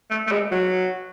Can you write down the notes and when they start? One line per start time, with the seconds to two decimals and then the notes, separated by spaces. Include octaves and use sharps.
0.11 A3
0.27 A3
0.32 G#3
0.51 F#3